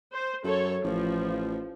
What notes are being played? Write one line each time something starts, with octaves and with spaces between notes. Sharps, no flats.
C5
F#2 A4 C#5
A1 F3